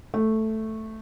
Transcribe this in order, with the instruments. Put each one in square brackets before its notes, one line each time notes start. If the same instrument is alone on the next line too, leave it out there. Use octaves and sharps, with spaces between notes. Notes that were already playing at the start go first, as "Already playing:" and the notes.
[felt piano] A3